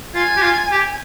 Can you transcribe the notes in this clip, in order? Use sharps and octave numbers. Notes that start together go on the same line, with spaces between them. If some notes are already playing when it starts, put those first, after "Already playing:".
F4 G#5
G4
F4
G4